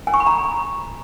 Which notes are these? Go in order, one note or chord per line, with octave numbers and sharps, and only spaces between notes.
G#5
C#6
B5
A#5